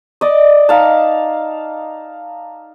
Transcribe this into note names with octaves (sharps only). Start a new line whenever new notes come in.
D5 D#5
D#4 F5 A5